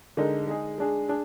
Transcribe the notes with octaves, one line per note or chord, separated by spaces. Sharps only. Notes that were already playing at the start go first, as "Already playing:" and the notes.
D3 G#3 D#4 A#4
G#3 D#4 G#4
G#3 D4 G#4
D4 G#4